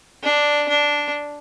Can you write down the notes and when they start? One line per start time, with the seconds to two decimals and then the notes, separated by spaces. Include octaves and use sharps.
0.23 D4
0.69 D4